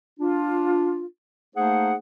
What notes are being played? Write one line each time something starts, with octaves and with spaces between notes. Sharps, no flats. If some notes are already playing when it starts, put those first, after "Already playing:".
D4 F4
A3 A#3 D#4 G#4 C5 F#5